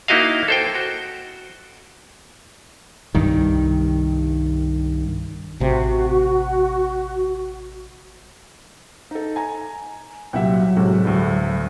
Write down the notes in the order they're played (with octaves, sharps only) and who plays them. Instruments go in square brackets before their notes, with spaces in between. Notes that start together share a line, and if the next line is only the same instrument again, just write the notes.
[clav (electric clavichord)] A#3 D#4 E4 F#4 D#5 F5
A4 C5 G5
F#4
[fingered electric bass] C2 G2 D#3
[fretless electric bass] A1 C3 [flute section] F#4
[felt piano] D#4 A4
G#5 A#5
[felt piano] C2 A#2 G4 [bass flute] F#3 [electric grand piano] E5 F#5 G5
[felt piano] A2 G#3 [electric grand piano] C3 F#4 G4
[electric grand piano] D2 G2